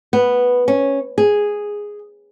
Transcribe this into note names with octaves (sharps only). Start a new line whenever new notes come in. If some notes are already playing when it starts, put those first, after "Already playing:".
B3
C#4
G#4